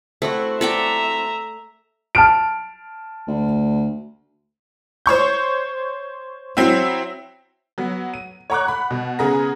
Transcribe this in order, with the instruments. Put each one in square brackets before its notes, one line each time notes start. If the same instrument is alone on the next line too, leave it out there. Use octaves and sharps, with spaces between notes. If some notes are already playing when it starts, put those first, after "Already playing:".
[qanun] A3 [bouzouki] C4 E4 F#4
[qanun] A4 D5 G5 [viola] E5 A#5
[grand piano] A5 F6 D7
[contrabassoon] D2
[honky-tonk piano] C5 C#5 C#6 G6
F#3 C4 E4
F#3 B3
D#7
C#5 F#5 A#5 C#6 D6 F#6
F#5 B5
B2
C#3 B3 G#4 A#5 A#6